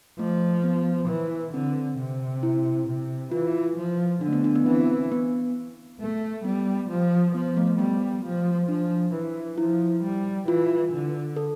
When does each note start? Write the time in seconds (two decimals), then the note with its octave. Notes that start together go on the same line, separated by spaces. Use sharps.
0.19 F3 A3
0.64 B3
1.08 E3
1.53 D3 C4
1.98 C3
2.43 E4
2.87 C3
3.32 E3 F4
3.77 F3
4.21 D3 D4
4.28 A3
4.33 B3
4.44 D4
4.55 B3
4.66 E3 C4
5.12 B3
6.00 A3
6.45 G3 B3
6.89 F3
7.35 F3 B3
7.57 A3
7.79 G3 B3
8.25 F3
8.69 F3 D4
9.14 E3
9.58 F3 E4
10.03 G3
10.48 E3 F4
10.92 D3
11.36 A4